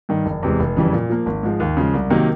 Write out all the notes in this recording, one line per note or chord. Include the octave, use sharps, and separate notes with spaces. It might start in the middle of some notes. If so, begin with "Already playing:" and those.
G2 D#3
F#1
E2 C3 E3 G#3
F1
F2 C#3 E3 G3
A#2
F3 A#3
G#1
G#2 F3 G#3
D#2
C#3 F3 G#3
C2
C3 D#3 F#3 A#3